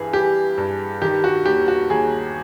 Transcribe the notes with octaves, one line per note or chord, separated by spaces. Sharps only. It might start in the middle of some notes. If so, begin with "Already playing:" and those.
Already playing: G2 E3 G#4
E3 G4
G2
D#3 G4
F#4
D#2 G4
F#4
D#2 G#4